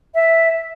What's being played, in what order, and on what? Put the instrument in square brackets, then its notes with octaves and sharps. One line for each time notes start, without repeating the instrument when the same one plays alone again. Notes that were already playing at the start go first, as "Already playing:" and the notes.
[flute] E5